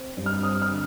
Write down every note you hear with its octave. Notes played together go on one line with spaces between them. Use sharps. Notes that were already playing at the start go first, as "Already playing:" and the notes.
Already playing: C4
G2
F6
C4 D#6
F6
D3